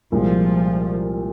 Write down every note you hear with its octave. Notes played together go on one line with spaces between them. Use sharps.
C2 A#2 F3 G#3